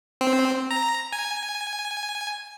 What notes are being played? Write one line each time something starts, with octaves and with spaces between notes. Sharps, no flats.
C4
A#5
G#5